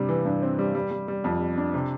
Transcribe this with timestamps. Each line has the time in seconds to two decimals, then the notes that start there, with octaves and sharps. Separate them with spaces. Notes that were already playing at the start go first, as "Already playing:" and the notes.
Already playing: G2 C3 G3
0.09 E3
0.25 G2
0.42 C4
0.59 G3
0.75 G3
0.91 G3
1.08 G3
1.24 F2
1.40 G3
1.58 D4
1.74 C3